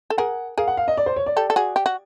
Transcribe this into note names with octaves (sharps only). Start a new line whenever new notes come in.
A4
G#4 A#4 F#5
G#4 A#4 F5
F#5
F5
D#5
D5
C5
C#5
D5
G4 A4
A4
F#4 G#4
G4
F#4